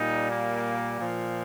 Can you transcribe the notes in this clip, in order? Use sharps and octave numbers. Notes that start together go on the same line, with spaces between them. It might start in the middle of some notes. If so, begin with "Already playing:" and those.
Already playing: A#2 G3 D#4
A#3
A#2 F3